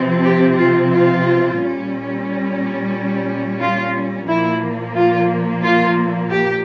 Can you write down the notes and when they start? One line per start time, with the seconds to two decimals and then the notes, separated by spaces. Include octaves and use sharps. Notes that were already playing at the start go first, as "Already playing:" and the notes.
Already playing: C3 F3 C4
0.24 G4
0.58 F4
0.92 F4
1.59 A#2 G3 C#4
3.61 F4
4.28 A#2 F3 A#3 E4
4.95 F4
5.62 F4
6.30 G4